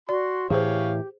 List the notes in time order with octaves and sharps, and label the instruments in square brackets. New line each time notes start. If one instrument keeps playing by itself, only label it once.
[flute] F#4 [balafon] D5 [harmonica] C6
[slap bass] A2 E3 [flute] G4 [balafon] G#4 C5 [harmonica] C#5 F5